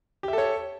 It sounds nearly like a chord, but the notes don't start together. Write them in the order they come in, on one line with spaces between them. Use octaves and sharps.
G4 E5 A4 C#5